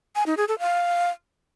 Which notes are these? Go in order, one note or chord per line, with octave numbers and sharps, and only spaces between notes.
G#5
D#4
G#4
A4
F5